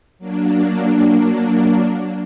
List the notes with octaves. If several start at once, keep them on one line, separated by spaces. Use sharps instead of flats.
F#3 A#3 D4